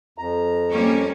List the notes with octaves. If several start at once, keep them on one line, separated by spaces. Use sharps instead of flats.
F2 A#5
G3 A#3 C#4